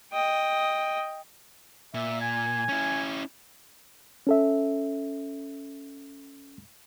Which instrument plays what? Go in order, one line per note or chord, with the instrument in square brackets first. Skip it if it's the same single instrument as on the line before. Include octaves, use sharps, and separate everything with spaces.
[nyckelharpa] D#5 G5
[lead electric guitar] A#2 [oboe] E5
[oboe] G#5
[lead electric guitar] C#4 E4
[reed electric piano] C#4 A4 E5